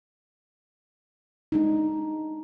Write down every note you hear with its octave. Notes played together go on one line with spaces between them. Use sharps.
G#3 D4 D#4